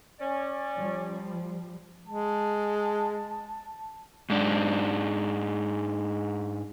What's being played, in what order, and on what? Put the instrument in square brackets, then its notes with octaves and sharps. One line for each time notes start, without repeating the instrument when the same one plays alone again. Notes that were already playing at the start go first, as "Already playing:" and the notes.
[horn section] C#4 D5
[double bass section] F3 G3
[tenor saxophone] G#3 [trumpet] A5
[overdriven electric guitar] G#2 D4